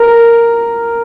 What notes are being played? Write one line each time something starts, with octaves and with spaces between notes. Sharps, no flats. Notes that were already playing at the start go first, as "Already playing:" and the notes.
Already playing: A#4